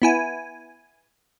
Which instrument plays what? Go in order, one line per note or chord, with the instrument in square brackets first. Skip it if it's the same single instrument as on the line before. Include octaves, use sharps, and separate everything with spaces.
[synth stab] B3 E4 G#5